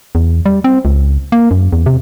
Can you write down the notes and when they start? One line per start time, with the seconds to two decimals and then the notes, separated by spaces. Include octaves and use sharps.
0.15 E2
0.46 G3
0.64 C4
0.85 C#2
1.32 A#3
1.51 F#2
1.73 E2
1.86 C3